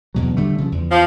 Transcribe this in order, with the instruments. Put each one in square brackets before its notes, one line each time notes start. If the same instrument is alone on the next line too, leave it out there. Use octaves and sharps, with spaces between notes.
[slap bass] E2 B2 F#3
D3 G3 A3
C#3 E3 F3
E2
[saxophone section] F3